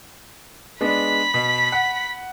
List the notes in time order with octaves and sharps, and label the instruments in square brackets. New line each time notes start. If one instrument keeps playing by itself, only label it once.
[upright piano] G#3 B3 D4 [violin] B5 B6
[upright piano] B2
F#5